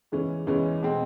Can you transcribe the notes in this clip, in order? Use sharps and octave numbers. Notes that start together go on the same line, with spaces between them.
E2 C#3 E3 G#3 C#4
E2 C#3 E3 G#3 C#4
B2 G#3 C4